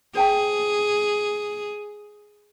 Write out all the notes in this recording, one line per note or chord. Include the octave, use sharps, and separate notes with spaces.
G#4 C5 G5 A5